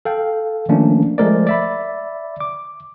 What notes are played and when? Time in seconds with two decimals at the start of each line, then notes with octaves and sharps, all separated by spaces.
0.05 A4 F5 G5
0.69 D#3 F3 A3 A#3 C#4 D4
1.18 F3 G#3 A3 A#4 C5 D5
1.47 D5 E5 B5
2.40 D6